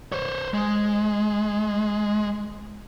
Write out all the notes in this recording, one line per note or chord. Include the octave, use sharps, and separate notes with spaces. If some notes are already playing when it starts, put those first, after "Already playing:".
C5 C#5
G#3